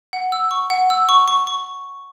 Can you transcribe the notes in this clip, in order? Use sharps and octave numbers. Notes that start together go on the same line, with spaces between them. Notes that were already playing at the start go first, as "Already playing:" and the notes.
F#5
E6
C#6
F#5
E6
C#6
C#6
C#6